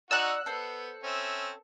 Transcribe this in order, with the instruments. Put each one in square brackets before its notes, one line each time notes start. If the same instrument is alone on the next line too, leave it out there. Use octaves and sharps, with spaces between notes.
[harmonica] D#4 F#4 [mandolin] D5 F#5 A#5 [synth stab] E6 F#6
[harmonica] B3 [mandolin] A4 C5
[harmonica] C4 C#4 E5